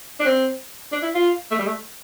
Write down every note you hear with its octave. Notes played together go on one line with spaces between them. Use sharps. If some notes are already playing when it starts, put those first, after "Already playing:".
D4
C4
D4
E4
F4
A3
G3
A3